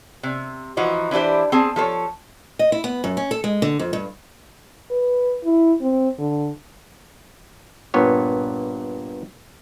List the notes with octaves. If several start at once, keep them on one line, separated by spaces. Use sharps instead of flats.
C3
E3 F3 D#4 F#4
E3 D4 E4 G4 C5
C4 G#4 A5
F3 A4 C5 C#5
D#5
E4
B3
F#2
C#4
A4
G#3
D3
F2
G2
B4
E4
C4
D3
G2 A#2 B3 C#5